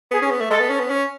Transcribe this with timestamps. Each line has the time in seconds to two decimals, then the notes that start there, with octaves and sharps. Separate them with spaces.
0.11 B3 G#4
0.22 C#4
0.31 B3
0.41 A3
0.50 G#3 A4
0.60 B3
0.70 C#4
0.80 B3
0.90 C#4